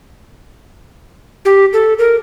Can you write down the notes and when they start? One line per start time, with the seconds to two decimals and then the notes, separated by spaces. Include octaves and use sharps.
1.45 G4
1.73 A4
1.99 A#4